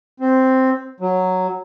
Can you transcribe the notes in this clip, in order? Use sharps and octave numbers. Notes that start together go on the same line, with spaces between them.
C4
F#3